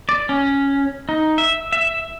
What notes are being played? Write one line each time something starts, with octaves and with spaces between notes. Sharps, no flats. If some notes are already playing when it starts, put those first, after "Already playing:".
D5
C#4
D#4
E5
E5